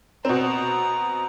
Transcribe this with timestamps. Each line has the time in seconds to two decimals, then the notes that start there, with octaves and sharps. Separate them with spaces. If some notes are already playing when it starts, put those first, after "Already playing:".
0.25 B2 C4 A#5